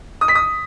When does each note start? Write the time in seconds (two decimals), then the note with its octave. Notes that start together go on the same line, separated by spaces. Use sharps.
0.21 D#6
0.28 B6
0.35 D#6